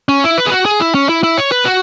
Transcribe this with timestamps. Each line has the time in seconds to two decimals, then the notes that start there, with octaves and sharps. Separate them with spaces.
0.09 C#4
0.24 E4
0.38 B4
0.46 G#4
0.51 F#4
0.66 G#4
0.80 E4
0.95 C#4
1.09 E4
1.24 E4
1.38 C#5
1.52 B4
1.65 F#4